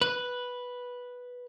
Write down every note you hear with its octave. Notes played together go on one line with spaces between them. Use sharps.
B4